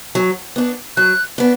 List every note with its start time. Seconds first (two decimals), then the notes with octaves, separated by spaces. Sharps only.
0.15 F#3
0.56 B3 D4
0.96 F#3 F#6
1.38 B3 D4